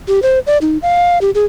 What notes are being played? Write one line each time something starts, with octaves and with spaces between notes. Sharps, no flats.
G4
C5
D5
D#4
F5
G4
G#4